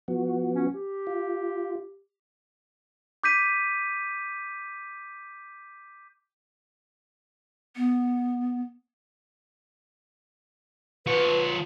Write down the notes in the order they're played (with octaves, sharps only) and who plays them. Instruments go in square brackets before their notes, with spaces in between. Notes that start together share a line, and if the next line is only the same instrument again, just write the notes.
[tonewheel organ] F3 B3 F#4
[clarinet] C#4
G4
[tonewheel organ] F4
[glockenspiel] D6 G6 B6 D#7
[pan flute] B3
[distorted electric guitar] F3 C#5 [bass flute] B4